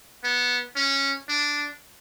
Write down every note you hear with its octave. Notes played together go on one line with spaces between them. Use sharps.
B3
C#4
D4